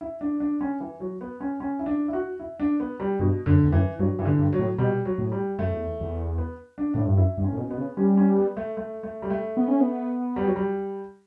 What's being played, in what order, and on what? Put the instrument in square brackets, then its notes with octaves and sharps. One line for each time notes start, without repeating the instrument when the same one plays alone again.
[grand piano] E4
D4
D4
C#4
E3
F#3
B3
C#4
C#4
E4
D4
E4
F#4
E4
D4
B3
G3
[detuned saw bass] G2 [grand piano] B2
[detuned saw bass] F#2 [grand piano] D3
[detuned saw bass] E2
[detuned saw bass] F#2 [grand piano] E3
[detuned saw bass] G2 [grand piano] F#3
[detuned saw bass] G2 [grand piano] E3
[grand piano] D3
[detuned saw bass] G2
[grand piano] F#3
[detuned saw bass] A2
[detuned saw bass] B2 [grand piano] G3
[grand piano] F#3
[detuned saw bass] A2
[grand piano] G3
[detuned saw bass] F#2 [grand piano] A3
[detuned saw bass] E2
E2
[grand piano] B3
D4
[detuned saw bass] A2 [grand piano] D4 E4
[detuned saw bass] G2
[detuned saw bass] F#2 [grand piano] E4
[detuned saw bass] G2
[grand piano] C#4
[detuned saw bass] A2
B2
[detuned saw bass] B2 [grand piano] B3
[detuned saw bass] C#3
[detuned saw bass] G3 [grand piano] C#4
[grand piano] C#4
B3
A3
A3
A3
G3
A3
[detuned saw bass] B3
C#4
B3
[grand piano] G3
F#3
G3